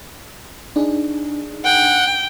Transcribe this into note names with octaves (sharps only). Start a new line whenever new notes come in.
D4 D#4 G#4
F#5 G5